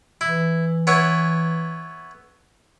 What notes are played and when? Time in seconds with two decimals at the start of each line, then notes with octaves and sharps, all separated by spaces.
0.21 E3 E4
0.87 B3 E4 C#5